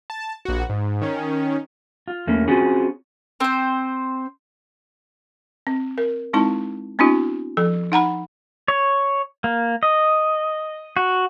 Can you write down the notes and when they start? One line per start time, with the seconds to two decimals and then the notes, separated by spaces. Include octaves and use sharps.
0.10 A5
0.45 A#1 F#4
0.70 G#2
1.02 D#3 C#4
2.08 F4
2.27 E2 A3 A#3 C#4
2.48 C4 C#4 F4 F#4 G#4
3.40 C4 C5
5.67 C4
5.98 A#4
6.33 G#3 C4 D#4 E4 A5
6.99 B3 C4 D4 E4 F#4
7.57 F3 A4
7.92 D#4 F#5 A#5 B5
8.68 C#5
9.44 A#3
9.83 D#5
10.97 F#4